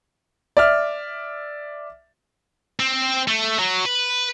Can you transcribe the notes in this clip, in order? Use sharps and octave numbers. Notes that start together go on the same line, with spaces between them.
D5 E5 F6
C4
A3
F#3
B4